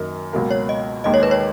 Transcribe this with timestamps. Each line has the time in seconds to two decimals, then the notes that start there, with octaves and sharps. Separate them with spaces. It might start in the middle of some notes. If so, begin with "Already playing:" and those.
Already playing: F#2 D#3 A#3 D#4
0.33 C#2 B2 F#3 A#3
0.51 C#5
0.69 D#5
1.04 D#2 D#3 G#3 D#4 D#5
1.14 C#5
1.23 B4
1.31 C#5